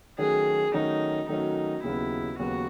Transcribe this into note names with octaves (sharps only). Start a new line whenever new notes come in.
D#3 F#3 A3 C#4 F#4 G#4
D#3 F#3 A3 C#4 D#4 F#4
D#3 F#3 A3 C#4 D#4 F#4
D#2 C#3 F#3 B3 E4
D#2 C#3 F#3 B3 F#4